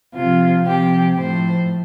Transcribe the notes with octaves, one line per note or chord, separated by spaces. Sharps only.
C3 F3 F4
C3 F3 G4
A2 F3 C5